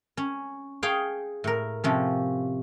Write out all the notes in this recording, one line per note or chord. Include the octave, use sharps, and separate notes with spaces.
C#4
G#4 C#5 F5 G5
A2 A#4
C3 F3 C#4